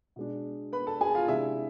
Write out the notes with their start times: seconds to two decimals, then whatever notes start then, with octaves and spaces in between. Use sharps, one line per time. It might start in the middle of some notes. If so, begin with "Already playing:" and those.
0.16 B2 G#3 D4
0.73 B4 B5
0.87 A4 A5
1.01 G#4 G#5
1.15 F4 F5
1.28 C3 G#3 D4 E4 E5